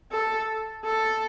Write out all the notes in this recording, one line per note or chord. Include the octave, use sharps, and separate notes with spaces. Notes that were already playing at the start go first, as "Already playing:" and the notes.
A4
A4